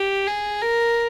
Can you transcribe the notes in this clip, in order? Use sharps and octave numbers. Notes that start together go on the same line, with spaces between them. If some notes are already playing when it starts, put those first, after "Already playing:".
Already playing: G4
G#4
A#4